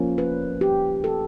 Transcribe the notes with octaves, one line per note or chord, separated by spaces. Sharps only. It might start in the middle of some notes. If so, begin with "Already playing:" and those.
Already playing: F3 A#3 C#4
B4
G4
A4